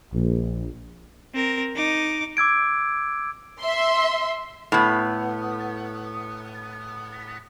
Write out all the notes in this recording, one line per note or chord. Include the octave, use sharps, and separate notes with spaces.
A#1
C4 A#4
D#4 D6
D6 E6 G#6 D7
E5 C6
A2 B3